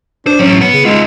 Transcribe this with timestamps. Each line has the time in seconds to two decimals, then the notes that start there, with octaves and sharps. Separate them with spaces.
0.27 D4 C5
0.40 A2 F#3 C#4
0.61 B3 F#5
0.74 C#3
0.85 G#3 D#4 F4